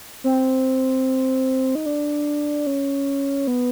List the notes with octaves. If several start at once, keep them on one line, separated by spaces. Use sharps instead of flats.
C4
D#4
D4
C#4
B3